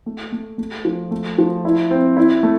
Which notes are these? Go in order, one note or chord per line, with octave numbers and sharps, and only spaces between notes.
A3
A3
A3
F3
A3
F3
E4
C4
E4
A3